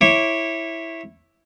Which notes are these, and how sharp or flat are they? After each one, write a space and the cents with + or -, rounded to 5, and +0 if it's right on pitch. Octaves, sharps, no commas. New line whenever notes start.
E4 +0 C#5 -20 D6 -20